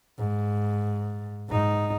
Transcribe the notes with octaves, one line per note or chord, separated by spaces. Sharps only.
G#2
G#2 D#4